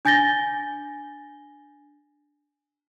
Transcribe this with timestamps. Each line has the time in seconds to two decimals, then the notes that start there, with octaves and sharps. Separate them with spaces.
0.05 D4 G#5 G6 A6 A#6 G7